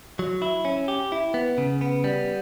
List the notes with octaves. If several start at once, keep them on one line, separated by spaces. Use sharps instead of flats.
F#3
E4
C#4
G4
E4
B3
C#3
B3
G3